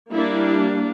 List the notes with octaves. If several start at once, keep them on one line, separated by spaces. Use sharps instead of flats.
G3 A#3 D4 E4